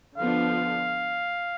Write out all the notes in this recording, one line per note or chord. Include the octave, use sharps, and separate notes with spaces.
D3 F3 B3 D4 F5